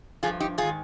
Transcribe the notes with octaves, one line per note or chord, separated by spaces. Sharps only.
G2 F3 F4 G#4
D#4 G4
G#2 D#3 F4 G#4